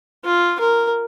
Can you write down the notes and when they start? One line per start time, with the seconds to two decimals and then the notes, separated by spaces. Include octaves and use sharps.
0.25 F4
0.60 A#4